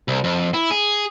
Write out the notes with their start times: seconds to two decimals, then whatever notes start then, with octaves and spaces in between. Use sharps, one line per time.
0.08 C2
0.24 F2
0.54 E4
0.71 G#4